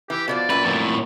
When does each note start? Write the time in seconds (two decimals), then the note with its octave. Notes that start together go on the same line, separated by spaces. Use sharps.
0.10 E3 G4
0.28 B2 D3 F3 D5
0.50 F#2 A#2 B4
0.64 F2 A2